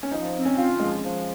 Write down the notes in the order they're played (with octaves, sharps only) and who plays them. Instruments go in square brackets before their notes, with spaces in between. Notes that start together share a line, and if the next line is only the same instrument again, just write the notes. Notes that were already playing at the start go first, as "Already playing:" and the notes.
[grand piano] C#4
[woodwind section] F3 [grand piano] D#4
[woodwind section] C4
[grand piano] C#4
[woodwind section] F4
[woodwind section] F3 [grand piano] G#3
[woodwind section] F3